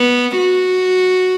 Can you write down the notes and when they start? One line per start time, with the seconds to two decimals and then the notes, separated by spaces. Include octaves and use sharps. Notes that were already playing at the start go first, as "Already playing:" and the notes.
Already playing: B3
0.37 F#4